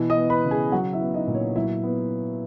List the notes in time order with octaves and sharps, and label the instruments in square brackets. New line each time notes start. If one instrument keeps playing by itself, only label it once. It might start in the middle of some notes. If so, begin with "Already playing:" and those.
Already playing: [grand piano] B2 E3
D#5 D#6
B3
B4 B5
C#3
G#4 G#5
F#3 F#4 F#5
E4 E5
B3
D#4 D#5
A#2
C#5
F#3 E4 E5
B3